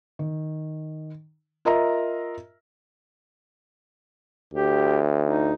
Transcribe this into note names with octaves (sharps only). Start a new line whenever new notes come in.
D#3
F4 A#4 D#5 E5 A#5
D2 G4
D#4